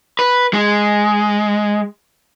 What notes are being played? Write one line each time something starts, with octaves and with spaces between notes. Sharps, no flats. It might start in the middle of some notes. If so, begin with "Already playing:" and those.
B4
G#3